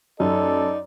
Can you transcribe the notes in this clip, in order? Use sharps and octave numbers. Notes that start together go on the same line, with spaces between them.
F#2 D#4 A4 D5